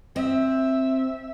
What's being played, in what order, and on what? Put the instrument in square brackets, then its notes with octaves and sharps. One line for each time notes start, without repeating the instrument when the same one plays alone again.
[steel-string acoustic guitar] C4 [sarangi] E5